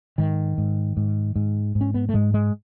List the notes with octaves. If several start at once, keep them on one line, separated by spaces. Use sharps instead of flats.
G#2 D#3
G#2
G#2
G#2
G#2
C#4
B3
A3
G#2 G#3
G#3